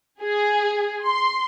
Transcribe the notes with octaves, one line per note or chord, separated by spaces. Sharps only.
G#4
C6